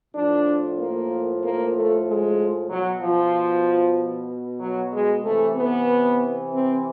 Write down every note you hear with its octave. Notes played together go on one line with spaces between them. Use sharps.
A2 F3 D4
A#3
A#3
A3
G#3
B2 F#3
F3
F#3
G#3
C3 E3 A3
B3
C4